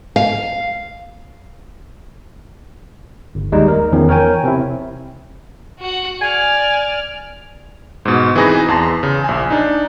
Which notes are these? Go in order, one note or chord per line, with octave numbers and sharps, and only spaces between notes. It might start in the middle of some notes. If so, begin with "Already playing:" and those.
F5
G1
D#2 G3 G#3 D#4
A#4
E2 D#3 F3 C#4
A#4 C#5 G5 G#5
C3 C4 E4
F#4 F#5
D5 G#5 F6
G#2 B2
E3 C4 D#4 G#4 B4 A#6
E2 A5 C6
C#3
A#1 G#5
D4 D#4